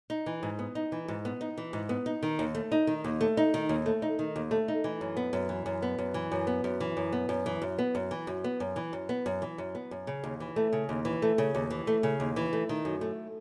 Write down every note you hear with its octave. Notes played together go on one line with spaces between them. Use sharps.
D#4
E3
G#2
B3
D#4
E3
G#2
B3
D#4
E3
G#2
B3
D#4
D#3
D#2
A3
D#4
D#3
D#2
A3
D#4
D#3
D#2
A3
D#4
D#3
D#2
A3
D#4
E3
F#2
B3
F#2
E3
F#2
B3
F#2
E3
F#2
B3
F#2
E3
F#2
B3
F#2
E3
F#2
B3
F#2
E3
F#2
B3
F#2
E3
F#2
B3
F#2
E3
F#2
B3
F#2
C#3
D#2
E3
A3
C#3
D#2
E3
A3
C#3
D#2
E3
A3
C#3
D#2
E3
A3
D#3
F#2
A3